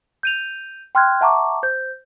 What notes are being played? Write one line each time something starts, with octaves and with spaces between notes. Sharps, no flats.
G6 D#7 F7
G5 C6 F6 F#6 G#6
E5 F#5 A5 A#5 C#6 D6
C5 G6